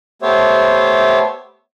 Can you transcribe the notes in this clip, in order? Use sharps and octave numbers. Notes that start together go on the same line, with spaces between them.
A3 B3 G4 C5 C#5 E5